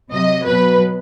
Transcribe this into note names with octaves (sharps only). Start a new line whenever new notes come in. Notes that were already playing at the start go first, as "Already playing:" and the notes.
C3 F#3 D#5
B2 F#3 B4